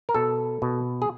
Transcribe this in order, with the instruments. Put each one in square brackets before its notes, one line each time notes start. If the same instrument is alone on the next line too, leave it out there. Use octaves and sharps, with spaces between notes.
[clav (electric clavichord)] A#4
B2 A4
B2
G#4